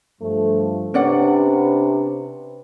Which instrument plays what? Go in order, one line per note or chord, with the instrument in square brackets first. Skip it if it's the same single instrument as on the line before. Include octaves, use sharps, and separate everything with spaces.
[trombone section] G2 F3 [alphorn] A3
[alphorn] C3 [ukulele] C#4 D5 F#5 [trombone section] D4 B4